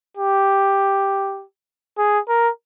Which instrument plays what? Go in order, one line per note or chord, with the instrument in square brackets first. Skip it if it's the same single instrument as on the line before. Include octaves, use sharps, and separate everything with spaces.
[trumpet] G4
G#4
A#4